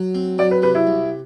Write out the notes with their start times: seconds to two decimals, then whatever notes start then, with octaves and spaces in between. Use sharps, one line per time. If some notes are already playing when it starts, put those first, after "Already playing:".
Already playing: F#3
0.15 C4
0.38 F#3 D5
0.51 B4
0.62 C3 B4
0.75 E4
0.87 C2